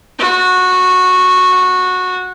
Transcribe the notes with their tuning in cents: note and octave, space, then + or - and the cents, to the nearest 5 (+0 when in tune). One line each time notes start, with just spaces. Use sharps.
F#4 -15